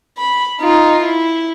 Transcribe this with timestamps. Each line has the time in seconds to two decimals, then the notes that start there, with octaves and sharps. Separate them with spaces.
0.18 B5
0.61 D#4 F4
1.04 E4